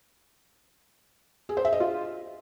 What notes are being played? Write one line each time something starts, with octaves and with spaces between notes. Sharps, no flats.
G#4
C5
E5
D#5
F4